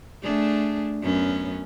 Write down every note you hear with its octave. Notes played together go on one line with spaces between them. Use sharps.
A3 D4 G#4
F#2 B3 C#4